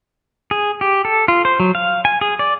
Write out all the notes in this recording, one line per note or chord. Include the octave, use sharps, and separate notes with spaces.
G#4
G4
A4
F4
C5
F#3
F5
G#5
G#4
D5